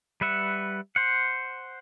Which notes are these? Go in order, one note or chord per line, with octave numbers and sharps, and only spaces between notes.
G3 B4 E5 F#5
C5 F#5